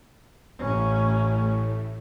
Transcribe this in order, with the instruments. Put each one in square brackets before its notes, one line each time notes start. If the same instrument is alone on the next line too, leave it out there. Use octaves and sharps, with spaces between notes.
[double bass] A1 C#4 [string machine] A2